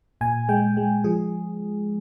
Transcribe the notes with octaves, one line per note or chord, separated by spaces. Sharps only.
A#2 G#5
G#3 G5
G#3
F3 G#4